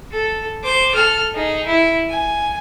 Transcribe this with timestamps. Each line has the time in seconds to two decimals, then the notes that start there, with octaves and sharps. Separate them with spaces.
0.12 A4
0.64 C5 D6
0.95 A4 F6
1.34 D#4 G#4
1.66 E4
2.10 G#5